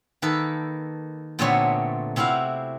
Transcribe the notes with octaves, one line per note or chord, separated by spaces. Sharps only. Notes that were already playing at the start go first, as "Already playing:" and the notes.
D#3 A#3 A4 B4
A#2 D3 A3 B3 C4 C#5
C3 C4 E4 F#4 F5